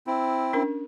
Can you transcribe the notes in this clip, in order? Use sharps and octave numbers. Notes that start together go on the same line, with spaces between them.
C4 E4
C#4 D4 A#4